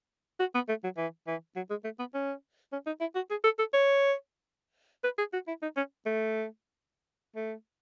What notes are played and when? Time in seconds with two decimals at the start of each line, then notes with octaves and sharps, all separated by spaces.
0.40 F#4
0.55 B3
0.69 A3
0.84 F#3
0.98 E3
1.27 E3
1.56 F#3
1.70 G#3
1.84 A3
1.99 B3
2.14 C#4
2.73 C#4
2.87 D#4
3.00 E4
3.15 F#4
3.30 G#4
3.44 A4
3.59 A4
3.74 C#5
5.04 B4
5.18 G#4
5.33 F#4
5.48 E4
5.62 D#4
5.77 C#4
6.06 A3
7.36 A3